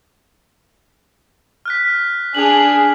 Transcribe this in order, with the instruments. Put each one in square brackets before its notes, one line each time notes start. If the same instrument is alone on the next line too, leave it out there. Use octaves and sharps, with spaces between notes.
[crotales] F6 F#6 B6
[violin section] D4 G#4 [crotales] F7 F#7